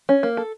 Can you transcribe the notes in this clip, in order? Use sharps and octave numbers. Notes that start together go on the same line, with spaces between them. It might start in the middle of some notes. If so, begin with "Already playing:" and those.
C#4
A#3
A4